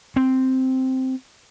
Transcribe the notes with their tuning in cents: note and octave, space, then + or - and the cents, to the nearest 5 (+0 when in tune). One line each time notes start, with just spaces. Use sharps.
C4 -5